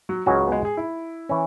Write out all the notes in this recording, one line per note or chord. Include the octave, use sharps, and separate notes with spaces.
F#3
C#2 C#3 F#3 G#3 C#4 F#4
G#3
B3
G#3
G#4
E4
E3 C#4